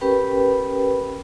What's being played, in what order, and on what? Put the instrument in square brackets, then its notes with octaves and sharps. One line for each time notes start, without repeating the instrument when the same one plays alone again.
[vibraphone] C#4 G4 A#4 B4 G5 B5